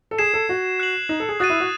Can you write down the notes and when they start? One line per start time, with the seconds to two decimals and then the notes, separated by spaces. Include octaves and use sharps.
0.11 A4
0.18 G#4 G#6 C7 E7
0.34 A4
0.49 F#4
0.80 F#6 C7 F#7
1.09 D#4
1.20 A4
1.29 G#4
1.40 F#4 D#6 F#6 A6 D#7
1.50 E4
1.60 F#4